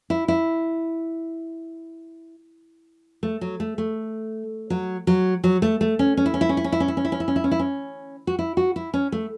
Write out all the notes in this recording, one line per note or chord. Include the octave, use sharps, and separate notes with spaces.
E4
E4
A3
F#3
A3
A3
F#3
F#3
F#3
A3
A3
C#4
C#4
E4
C#4
E4
C#4
E4
C#4
E4
C#4
E4
C#4
E4
C#4
E4
C#4
E4
C#4
E4
C#4
F#4
E4
F#4
E4
C#4
A3